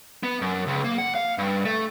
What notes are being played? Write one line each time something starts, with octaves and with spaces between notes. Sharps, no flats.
B3
F#2
C#2
A#3
F#5
F5
G2
A3